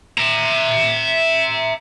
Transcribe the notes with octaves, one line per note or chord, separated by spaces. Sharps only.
E5 A#5